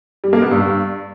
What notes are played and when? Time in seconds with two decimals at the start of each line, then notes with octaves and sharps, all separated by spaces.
0.24 G3
0.33 A#3
0.42 B3
0.51 G2